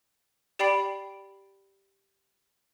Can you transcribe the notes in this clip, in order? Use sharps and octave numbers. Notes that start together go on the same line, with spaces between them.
G4 D5 G5 B5 C7 D7